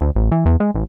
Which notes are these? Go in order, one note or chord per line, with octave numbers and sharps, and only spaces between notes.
D2
A1
E3
E2
G#3
A1